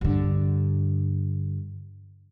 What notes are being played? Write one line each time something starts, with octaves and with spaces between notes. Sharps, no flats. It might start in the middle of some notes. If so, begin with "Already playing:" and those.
G2 D3